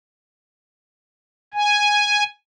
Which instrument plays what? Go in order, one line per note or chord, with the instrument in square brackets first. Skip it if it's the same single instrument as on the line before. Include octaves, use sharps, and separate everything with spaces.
[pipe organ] G#5